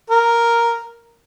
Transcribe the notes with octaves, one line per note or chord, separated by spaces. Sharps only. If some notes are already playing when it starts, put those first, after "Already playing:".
A#4